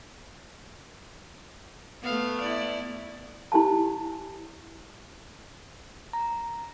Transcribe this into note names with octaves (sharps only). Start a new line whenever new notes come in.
A3 B3 F5
E4 D5
E4 G4 G#5 A5
A#5